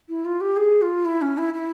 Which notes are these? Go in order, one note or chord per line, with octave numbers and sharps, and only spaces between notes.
E4
F4
G4
G#4
F4
E4
C#4
E4
E4